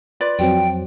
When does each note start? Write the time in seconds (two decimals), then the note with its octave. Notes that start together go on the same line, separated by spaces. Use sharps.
0.21 F4 B4 D5
0.39 F2 F#3 C4 G5